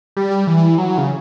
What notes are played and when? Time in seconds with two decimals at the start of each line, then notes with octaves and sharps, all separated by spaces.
0.17 G3
0.47 E3
0.78 F#3
0.98 C#3